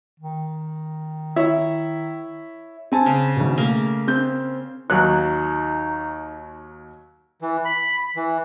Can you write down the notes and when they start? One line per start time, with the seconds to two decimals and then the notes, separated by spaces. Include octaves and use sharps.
0.20 D#3
1.36 E4 C#5 E5
2.92 C4 G#5 A5
3.06 C#3
3.36 G#1 B2
3.58 A3 A#3
4.08 C4 G6
4.90 D#2 F#3 D#4 F#6
7.41 E3
7.65 B5
8.16 E3